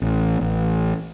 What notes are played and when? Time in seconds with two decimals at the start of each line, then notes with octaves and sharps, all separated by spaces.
0.02 A1
0.41 A1